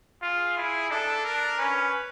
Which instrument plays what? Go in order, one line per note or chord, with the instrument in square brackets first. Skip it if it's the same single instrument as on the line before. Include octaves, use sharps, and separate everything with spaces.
[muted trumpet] F4 [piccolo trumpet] G#4
[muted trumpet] E4
[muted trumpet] D4 [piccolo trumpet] A4
[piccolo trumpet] A#4
[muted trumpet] C#4 [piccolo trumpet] B4